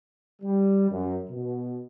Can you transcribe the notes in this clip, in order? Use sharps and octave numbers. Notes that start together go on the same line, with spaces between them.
G3
F#2
B2